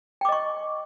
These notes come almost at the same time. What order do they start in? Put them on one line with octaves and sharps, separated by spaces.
G5 D6 D#5 C#6